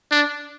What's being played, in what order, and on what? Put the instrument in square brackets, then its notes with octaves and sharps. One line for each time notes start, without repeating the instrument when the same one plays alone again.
[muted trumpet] D4